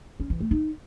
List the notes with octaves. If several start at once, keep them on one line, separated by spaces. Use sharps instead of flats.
C#4
E3
A3
D#4